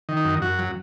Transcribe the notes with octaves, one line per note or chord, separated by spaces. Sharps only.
D#3
D#4
F#2
F#2 F#4
F#3